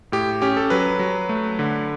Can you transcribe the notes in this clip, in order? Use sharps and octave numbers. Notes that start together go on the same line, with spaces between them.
A2 G4
C#4 G4
A4
F#3 B4
F#3
A3
D3